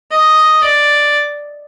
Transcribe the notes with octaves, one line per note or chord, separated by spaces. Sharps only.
D#5
D5